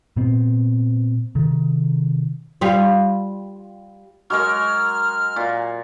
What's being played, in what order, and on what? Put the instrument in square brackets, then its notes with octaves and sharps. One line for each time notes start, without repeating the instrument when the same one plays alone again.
[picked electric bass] A#2 B3 C4
C3 D#3
[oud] G3 F4
[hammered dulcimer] F#3 G#3 A#4 [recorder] F6
[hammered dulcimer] A#2